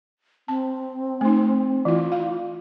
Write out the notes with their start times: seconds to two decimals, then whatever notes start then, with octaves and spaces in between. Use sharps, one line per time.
0.48 C4 A5
1.21 A3 D#4
1.85 E3 E4 F4
2.12 F5